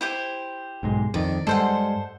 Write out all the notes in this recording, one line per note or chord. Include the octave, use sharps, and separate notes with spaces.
E4 G4 C5
B1 G#2 G#3
F2 D#3 D5
G2 G3 G#3 A4 C5 F#5